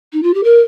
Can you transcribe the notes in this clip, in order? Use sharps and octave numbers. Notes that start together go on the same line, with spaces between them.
D#4
F4
G4
A#4